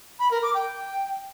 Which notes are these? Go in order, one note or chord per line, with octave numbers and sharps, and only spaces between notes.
B5
A#4
D6
G5